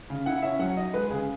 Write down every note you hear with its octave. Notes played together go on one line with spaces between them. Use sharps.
C#3
E4 F#5
C#4 E5
F#3 F#5
D#4 D#5
G#3 B4
C#3 G#4